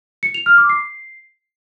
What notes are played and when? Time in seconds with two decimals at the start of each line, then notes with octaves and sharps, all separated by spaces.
0.23 C#7
0.34 F7
0.46 F6
0.58 D6
0.69 C7